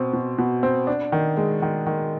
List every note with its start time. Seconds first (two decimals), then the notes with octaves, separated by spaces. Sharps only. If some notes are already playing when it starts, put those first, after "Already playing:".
Already playing: B2 C4
0.13 B2
0.38 B2
0.63 C4
0.87 D4
1.12 D#3
1.37 G#3
1.62 D#3
1.87 D#3